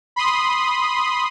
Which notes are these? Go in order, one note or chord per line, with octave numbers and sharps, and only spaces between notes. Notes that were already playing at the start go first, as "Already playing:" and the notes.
B5 C6 D#6